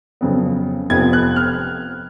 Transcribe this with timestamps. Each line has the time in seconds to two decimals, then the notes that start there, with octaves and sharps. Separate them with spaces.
0.21 F2 C#3 F#3 B3
0.90 F1 F2 F3 B3 G#6
1.13 F#6
1.36 F6